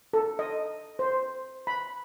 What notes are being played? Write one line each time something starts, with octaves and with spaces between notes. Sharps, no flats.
A4
D#5
C5
B5